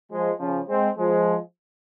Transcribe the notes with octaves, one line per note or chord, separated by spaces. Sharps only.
F3 G#3
C#3 F3
G#3 C4
F3 G#3